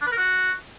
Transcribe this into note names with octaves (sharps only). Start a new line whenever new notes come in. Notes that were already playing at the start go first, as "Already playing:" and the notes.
D4
B4
A#4
F#4